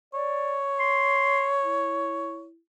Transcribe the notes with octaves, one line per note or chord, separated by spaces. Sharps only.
C#5 D5
C6
E4